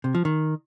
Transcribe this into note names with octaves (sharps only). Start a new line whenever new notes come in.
C3
F3
D#3